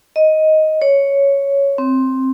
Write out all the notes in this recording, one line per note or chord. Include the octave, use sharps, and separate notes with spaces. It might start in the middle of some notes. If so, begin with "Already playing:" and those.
D#5
C#5
C4